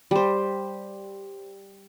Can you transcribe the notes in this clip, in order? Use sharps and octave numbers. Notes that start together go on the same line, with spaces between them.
G3 C5